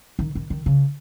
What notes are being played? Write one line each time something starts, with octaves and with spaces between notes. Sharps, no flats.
D#3
D#3
D#3
C#3